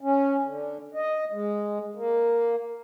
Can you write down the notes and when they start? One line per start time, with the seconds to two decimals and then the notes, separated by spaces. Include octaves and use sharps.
0.01 C#4
0.44 D3
0.94 D#5
1.32 G#3
1.95 A#3